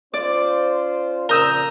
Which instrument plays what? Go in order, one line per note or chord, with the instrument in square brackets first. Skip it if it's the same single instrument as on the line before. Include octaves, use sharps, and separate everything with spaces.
[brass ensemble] C#4 F4 C5 [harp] D5
[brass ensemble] F2 A#2 C#3 [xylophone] A#4 G6 [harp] A#5 D#6 E6